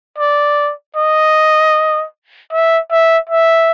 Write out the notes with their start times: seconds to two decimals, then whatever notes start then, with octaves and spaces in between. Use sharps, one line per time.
0.18 D5
0.96 D#5
2.52 E5
2.91 E5
3.29 E5